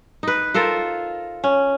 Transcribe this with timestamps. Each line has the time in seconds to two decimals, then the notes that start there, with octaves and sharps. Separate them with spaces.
0.23 D#4 B4
0.54 F4 A4 A#4 C5
1.44 C#4